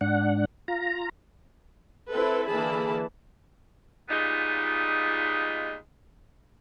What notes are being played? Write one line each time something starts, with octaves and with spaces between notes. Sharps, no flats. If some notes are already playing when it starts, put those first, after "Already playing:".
G#2 D4 F#5
F4 A#5
C4 E4 A4 B4
D3 E3 A#3 G#4 A5 B5
A#2 G3 G#3 B3 D#4 F4